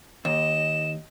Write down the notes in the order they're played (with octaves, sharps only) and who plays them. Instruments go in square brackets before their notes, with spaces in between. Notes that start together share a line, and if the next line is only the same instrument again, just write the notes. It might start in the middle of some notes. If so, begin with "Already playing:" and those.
[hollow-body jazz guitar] D#2 [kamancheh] D#5 [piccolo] E7